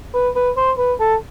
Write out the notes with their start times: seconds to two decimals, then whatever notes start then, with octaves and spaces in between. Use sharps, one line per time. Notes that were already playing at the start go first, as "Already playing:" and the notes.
0.14 B4
0.36 B4
0.56 C5
0.78 B4
1.00 A4